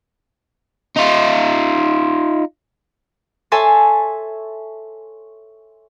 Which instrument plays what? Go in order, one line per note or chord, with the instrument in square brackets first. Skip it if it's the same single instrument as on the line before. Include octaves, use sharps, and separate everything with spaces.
[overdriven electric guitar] D#4 F4
[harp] A4 C#5 E5 G#5 A5 C6